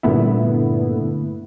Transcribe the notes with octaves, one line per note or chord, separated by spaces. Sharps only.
G2 A#2 D3 A3 B3 E4